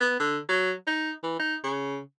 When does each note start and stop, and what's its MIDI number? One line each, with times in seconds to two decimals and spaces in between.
0.01 0.18 59
0.20 0.38 50
0.49 0.73 54
0.87 1.11 63
1.23 1.38 52
1.39 1.56 63
1.64 1.99 49